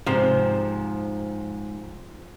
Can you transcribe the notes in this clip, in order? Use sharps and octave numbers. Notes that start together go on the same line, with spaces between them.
G#2 C3 F3 C5